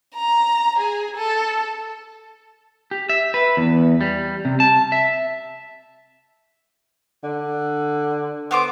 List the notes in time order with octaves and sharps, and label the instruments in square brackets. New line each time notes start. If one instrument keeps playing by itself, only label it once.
[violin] A#5
G#4
A4
[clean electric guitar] G4
E5
B4
E2
G3
C3
A5
E5
[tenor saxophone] D3
[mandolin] B3 C5 D6